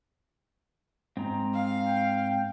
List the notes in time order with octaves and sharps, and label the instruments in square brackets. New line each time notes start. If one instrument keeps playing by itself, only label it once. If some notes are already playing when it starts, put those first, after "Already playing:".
[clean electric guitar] G#2 [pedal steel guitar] C4 A#5
[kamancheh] F5
[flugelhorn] G5